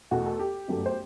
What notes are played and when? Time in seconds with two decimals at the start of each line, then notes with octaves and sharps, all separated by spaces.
0.11 E2 B2 A3 F#4
0.26 A4
0.40 G4
0.68 G1 F#2 F#3 A3
0.86 C5